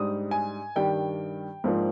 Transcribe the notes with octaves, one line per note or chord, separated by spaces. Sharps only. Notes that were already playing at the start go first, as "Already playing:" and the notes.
Already playing: G#2 G3 D4 D#6
G#5
G2 D#3 G3 D4 G5
G#2 F3 A#3 D4